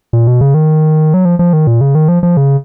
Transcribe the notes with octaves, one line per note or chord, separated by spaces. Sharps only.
A#2
B2
C#3
D#3
F#3
F3
F3
D#3
A#2
C#3
D#3
F3
F3
C#3